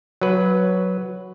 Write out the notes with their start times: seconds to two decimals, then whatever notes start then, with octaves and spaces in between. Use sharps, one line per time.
0.21 F#3 B4